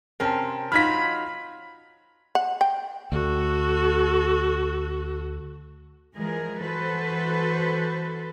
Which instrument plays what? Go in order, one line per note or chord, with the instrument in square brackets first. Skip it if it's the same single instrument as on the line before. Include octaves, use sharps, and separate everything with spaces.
[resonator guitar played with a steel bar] C3 C4 C#4 [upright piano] A#4 A5
[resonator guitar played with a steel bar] F#3 D#4 F4 [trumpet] B5 [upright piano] F6 G#6 B6
[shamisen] F#5
G5
[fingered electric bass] D2 [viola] F#4 A4
[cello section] E3 F3 G#3 G#4 A#4
E3 F#4 A4 B4 C5